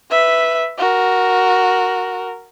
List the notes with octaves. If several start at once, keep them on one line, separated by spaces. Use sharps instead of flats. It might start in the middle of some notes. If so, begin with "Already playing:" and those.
B4 E5
F#4 A#4